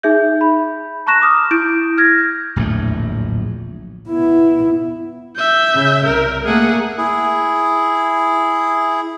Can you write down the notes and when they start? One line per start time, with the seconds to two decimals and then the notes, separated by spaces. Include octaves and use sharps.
0.03 D#4 G#4 E5 G6
0.41 B5
1.06 A5 A#5 C#6 F#6 A#6 E7
1.22 D6 D#6 F6
1.51 E4 G6 D7
1.98 F6 G#6 A#6
2.56 D1 A#1 E2 A3
4.09 B3 E4
5.37 E5 G6
5.74 C#3
6.06 C2 A#4
6.45 A3 A#3 G#4 F#5
6.98 E4 G#4